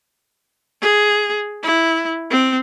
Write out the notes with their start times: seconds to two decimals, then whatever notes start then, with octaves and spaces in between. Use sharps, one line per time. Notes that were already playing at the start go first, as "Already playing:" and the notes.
0.82 G#4
1.63 E4
2.30 C4